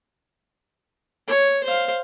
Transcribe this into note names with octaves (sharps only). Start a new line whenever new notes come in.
C#5
C5 F5